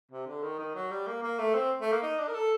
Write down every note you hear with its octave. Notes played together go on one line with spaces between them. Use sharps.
C3
D3
D#3
D#3
F#3
G3
A#3
A#3
A3
C4
A3
A#3
D#4
D4
A#4
A4